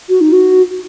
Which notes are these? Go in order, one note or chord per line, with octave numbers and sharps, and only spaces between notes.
F#4
D#4
F#4